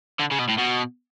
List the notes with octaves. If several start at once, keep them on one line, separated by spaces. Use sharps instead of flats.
D3
C#3
B2
A2
B2